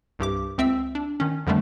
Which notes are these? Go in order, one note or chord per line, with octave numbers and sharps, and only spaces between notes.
C2 G2 G4 D6
C#2 C4 E5 E6
D4
D#3 C#4
F2 D3 D#3 G3 A3 D4